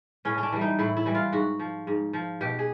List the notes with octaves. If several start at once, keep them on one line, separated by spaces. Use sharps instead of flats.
A2 C#4
C#4
D4
E3 G3
D#4
A2 E4
E4
E3 G3
F4
G#2 F#4
F3
G#2
F3
B2 G4
G#4